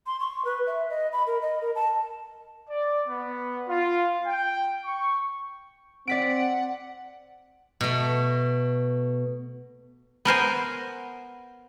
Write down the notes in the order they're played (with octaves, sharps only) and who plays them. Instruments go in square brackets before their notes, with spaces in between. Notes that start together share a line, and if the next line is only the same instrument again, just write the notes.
[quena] C6
C#6
B4
E5
D#5
B5
A#4
D#5
A#4
A5
[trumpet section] D5
B3
F4
G5
C#6
[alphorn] C4 [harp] D5 B6 D7 [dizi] F#5
[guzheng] B2 A3
B3 A#4 C5 G#5